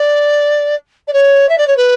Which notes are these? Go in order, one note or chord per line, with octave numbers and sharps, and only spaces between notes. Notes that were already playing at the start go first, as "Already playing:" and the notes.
Already playing: D5
D5
C#5
E5
D5
C#5
B4